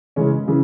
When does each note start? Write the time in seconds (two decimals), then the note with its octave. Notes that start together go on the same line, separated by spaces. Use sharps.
0.16 C#3 E3 G#3 C#4
0.48 C#3 E3